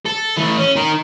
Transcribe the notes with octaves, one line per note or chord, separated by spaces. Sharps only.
A4
E3 A3
C#4
D#4 A#4